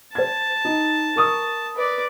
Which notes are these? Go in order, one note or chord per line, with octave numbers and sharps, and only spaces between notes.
C5 A5 G#6
D#4
A#4 C#6 D#6
B4 D5